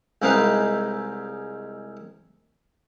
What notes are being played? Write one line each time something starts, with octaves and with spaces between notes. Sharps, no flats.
C2 G#3 C4 D#4 B4 F5